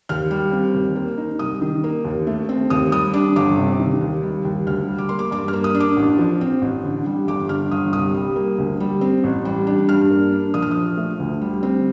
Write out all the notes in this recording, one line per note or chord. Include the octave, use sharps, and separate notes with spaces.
D#2 F6
G3
C4
D#2
A#3
D#4
C2 D#6
D#3
A#3
D#2
A3
C4
D#2 D#6
G3 D#6
D4 D6
G1 D6
C3
D#3
D#2
G3
D#2
D2 F6
G3
D6
A#3 C6
D6
G2 D6
F6
A#3
D#6
D4
D6
A1
F3
C4
A1
D3
G3
G1 D6
D3 F6
G1 D#6
C2 D#6
G3
A#3
D2
G3
C4
A1
G3
D4
G2 F6
A#3
D4
A#1 D#6
F6
F3 D#6
A3
D2
G3
C4